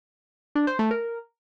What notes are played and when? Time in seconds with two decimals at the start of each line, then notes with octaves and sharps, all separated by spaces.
0.55 D4
0.67 C5
0.79 A3
0.91 A#4